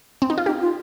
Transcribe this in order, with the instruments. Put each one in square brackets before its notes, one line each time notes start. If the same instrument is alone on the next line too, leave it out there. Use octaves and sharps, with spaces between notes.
[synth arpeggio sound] C4
D#4
F4
[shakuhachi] D#4 [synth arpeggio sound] G4
[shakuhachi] F4